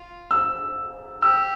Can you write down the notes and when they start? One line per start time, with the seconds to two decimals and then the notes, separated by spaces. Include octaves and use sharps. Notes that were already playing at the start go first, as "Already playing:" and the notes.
Already playing: F4
0.31 E6
1.22 G4 E6